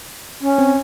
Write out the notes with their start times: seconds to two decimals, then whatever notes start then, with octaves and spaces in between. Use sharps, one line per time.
0.41 C#4
0.59 C4